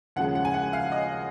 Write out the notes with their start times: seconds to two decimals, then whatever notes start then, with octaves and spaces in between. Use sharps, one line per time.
0.16 D#2 C#3 F3 G#3 F#5
0.35 F#5
0.45 G#5
0.54 F#5
0.73 F5
0.92 D#5